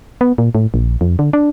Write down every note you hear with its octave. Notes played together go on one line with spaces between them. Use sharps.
B3
A#2
A2
A#1
F2
D3
D4